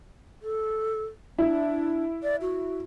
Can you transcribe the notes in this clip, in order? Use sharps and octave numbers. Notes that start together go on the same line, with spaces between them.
A4
D4 E4
D5
F#4